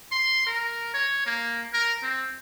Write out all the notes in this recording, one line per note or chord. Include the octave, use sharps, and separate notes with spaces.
C6
A#4
C#5
A#3
A#4
C4